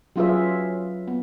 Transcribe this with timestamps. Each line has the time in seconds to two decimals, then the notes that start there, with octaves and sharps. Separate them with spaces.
0.16 F#3 C#4 F4 G#4 B4 E5
1.08 B3